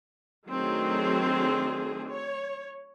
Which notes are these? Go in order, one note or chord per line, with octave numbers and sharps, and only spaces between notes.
D#3 F#3 A3 C4 D4 G#4
C#5